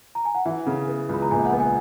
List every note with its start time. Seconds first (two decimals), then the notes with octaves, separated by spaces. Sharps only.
0.15 A#5
0.25 G#5
0.35 F#5
0.45 E3 E5
0.66 C#3
0.88 B3
1.09 C#2 B5
1.22 A#5
1.31 A#1 G#5
1.46 F#5
1.53 B3
1.60 G#5